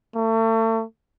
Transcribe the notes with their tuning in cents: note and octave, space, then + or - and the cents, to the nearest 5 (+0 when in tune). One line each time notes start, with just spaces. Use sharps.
A3 +35